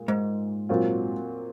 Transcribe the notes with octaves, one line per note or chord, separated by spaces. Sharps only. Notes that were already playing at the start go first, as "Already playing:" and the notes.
Already playing: A#2 G#3
G#2
A#2 F#3 C4 F4